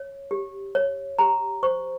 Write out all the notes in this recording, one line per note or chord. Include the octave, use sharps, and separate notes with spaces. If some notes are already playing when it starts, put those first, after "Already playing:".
Already playing: C#5
G4
C#5
G4 A#5
C5 C#6